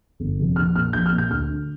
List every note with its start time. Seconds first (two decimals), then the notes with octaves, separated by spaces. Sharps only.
0.20 G1
0.38 F2 C3
0.56 A#1 F6
0.75 A#2 F6
0.93 A#1 G6
1.06 F6
1.12 A#2
1.18 G6
1.30 D2 F6
1.49 D3